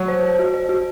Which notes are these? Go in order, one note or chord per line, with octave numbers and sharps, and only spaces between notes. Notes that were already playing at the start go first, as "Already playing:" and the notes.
Already playing: F#3
C5
C5
F#4
C5
F#4